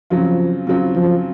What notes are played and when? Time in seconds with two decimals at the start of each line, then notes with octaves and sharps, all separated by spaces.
0.10 C#3 F3 F#3 C4 F4
0.67 C#3 F#3 C4 F4
0.95 F3